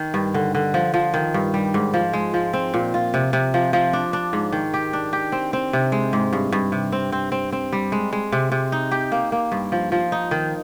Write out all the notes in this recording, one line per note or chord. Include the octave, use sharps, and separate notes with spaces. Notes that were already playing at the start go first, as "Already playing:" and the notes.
Already playing: D#3
G2
D3
D3
F3
F3
D#3
G2
G3
G#2
F3
G#3
F3
C4
A#2
F4
C3
C3
F3
F3
D4
D4
G#2
D#3
G4
D4
G4
C4
C4
C3
G#3
G#2
G2
G2
C3
C4
C4
C4
C4
G3
G#3
G#3
C3
C3
D#4
G4
A#3
A#3
G2
F3
F3
D#4
D#3